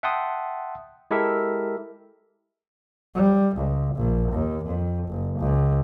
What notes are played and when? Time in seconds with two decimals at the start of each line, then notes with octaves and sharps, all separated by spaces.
0.03 E5 F#5 G5 A5 C6 D#6
1.11 G#3 E4 G4 A4 A#4 E5
3.14 G3
3.56 C#2
3.95 A#1
4.32 D#2
4.65 F2
5.08 F#1
5.39 C#2